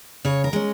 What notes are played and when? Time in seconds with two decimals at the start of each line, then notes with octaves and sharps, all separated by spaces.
0.25 C#3 C#5
0.44 A#4
0.53 G#3 C#4